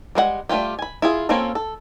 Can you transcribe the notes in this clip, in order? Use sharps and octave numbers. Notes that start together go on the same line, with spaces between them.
G3 G#3 C5 F#5
G3 A3 C#4 F4 G4
G#5 B5
E4 F4 G#4
A#3 C4 C#4 F4 A4
A4